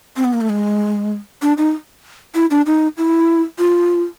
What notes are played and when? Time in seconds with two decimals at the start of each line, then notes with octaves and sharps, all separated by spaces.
0.17 C4
0.24 B3
0.33 A#3
0.41 A3
0.49 G#3
1.42 D4
1.58 D#4
2.35 E4
2.51 D4
2.66 D#4
2.98 E4
3.59 F4